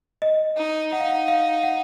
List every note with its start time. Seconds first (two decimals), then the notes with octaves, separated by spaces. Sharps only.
0.22 D#5
0.57 D#4
0.92 D#4 F#5
1.00 F5
1.10 F#5
1.28 F5
1.63 F#5